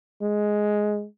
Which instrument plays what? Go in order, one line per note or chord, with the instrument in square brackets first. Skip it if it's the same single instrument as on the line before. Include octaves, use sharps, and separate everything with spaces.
[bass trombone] G#3